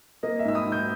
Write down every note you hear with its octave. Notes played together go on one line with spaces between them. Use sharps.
A#3 D#5
E5
G#2 E6
B5 D#6
G#2
D#6 G6